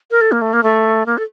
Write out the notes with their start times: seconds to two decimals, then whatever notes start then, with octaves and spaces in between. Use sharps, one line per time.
0.11 A#4
0.21 A4
0.32 A#3
0.42 A3
0.53 A#3
0.63 A3
1.06 A#3
1.18 A4